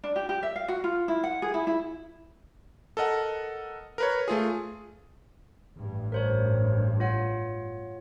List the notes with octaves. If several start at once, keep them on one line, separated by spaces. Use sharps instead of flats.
D4
G4
G4
E5
F5
F#4
F4
E4
F#5
G#4
E4
E4
A4 A#4 D#5 F#5
A#4 B4 C#5
A3 F4 G#4
A1 G2
A#4 C5 C#5
F4 C#5 F#5